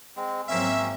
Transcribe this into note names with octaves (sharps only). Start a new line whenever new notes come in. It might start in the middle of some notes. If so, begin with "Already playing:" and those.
G#3 C4
G#1 F#3 A#3 C4 C#4 E5